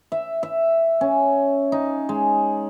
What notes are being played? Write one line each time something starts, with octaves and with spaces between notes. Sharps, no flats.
E5
E5
C#4
D#4
G#3